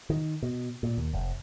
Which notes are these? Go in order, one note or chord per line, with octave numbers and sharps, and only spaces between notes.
D#3
B2
A#2
D#2
F1